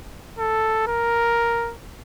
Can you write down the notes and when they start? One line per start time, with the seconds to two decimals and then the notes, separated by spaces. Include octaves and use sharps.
0.39 A4
0.87 A#4